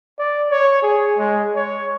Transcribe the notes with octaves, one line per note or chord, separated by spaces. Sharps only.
D5
C#5
G#4
G#3
C#5